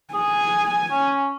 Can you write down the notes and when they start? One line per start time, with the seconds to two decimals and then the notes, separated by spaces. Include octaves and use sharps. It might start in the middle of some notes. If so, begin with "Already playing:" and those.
0.14 G#4 G#5
0.91 C#4